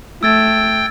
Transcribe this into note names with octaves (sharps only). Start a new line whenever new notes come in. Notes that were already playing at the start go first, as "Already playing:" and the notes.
A3 G5 E6 G#6 A6